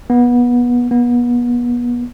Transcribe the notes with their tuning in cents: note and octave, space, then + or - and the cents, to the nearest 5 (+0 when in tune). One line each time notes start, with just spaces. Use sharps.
B3 -25
B3 -35